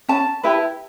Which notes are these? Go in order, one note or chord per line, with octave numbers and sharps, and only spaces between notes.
C#4 A5
E4 G4 B4